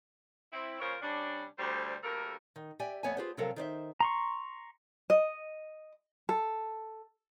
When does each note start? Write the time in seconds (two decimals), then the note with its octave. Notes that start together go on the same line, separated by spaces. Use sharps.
0.53 C4 E4
0.80 A#2 C#3 F4 A#4 C5 C#5
1.02 C3 G3 C#4 D4
1.58 D2 G3 C5
2.04 D2 G2 A#3 A4 A#4
2.56 D#3
2.79 G4 D5 E5 G5 G#5
3.03 F2 A3 B3 C#5 E5 G#5
3.17 F4 G4 G#4 B4 C5
3.37 C3 F3 F#3 A4 A#4 F5
3.56 D#3 C5 D5 E5
4.00 A#5 C6 C#6
5.10 D#5
6.29 A4